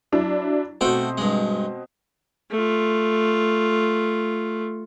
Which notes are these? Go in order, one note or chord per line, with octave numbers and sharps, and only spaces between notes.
F#3 D4 E4
B2 A3 C4 F#4 G5
G2 G#3
A3 F4